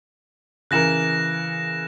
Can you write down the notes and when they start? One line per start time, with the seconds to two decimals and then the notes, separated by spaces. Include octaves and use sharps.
0.71 C#3 E3 A#4 F#6 A#6 E7